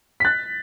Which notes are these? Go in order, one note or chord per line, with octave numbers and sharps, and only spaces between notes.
B6
F#6 A6